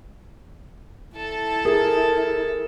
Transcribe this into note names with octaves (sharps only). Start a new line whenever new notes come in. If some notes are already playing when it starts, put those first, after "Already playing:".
E4 A4 A5
G#4 A#4